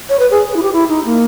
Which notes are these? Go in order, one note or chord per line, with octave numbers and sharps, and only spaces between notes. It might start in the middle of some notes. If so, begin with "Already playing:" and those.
C#5
B4
G#4
G#4
E4
G4
E4
D#4
A#3